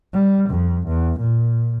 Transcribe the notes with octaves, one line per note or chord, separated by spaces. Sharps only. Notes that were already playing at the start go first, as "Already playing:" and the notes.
G3
F2
E2
A#2